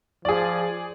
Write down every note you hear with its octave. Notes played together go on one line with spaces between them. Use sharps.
F3 G#4 D5